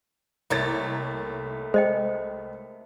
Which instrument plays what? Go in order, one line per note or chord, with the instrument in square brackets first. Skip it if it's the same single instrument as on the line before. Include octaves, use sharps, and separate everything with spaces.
[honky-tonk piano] C2 C#5 A6 [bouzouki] A3 A#3 D#4
[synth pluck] G#3 [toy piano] C5 D#5 G5